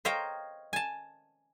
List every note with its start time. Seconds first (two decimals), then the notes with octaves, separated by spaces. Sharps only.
0.05 C5 C#5 D#5 F5 G5 A#5
0.73 G#5 A5